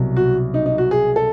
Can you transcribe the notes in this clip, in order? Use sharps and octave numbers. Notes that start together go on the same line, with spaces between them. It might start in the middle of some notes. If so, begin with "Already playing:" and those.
Already playing: C2 B2 F#3
F#4
D#4
D#4
F#4
G#4
A4